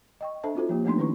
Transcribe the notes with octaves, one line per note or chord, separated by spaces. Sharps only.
D#5 G5 C#6
D4 A4 C5 E5 A5
C4 D#4 F4 F#4 A4 C5
F3 A#3 G4
F3 A3 B3 D4 D#4 C6
D#3 C#4 E4 B4 C#6